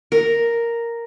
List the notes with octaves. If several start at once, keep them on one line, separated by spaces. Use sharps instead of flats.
A#4